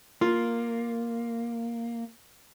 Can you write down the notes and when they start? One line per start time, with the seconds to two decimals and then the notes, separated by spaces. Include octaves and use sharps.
0.21 A#3 F4